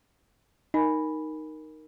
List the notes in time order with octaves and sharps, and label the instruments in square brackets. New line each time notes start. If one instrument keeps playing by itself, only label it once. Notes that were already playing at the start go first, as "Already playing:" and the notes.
[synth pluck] D#4 [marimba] A#4 G#5 B5